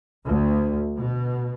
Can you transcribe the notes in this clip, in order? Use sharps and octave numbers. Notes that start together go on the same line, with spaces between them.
D2
B2